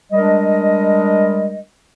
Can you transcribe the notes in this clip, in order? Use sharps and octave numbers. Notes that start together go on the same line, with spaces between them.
G3 G#3 D4 A#4 D#5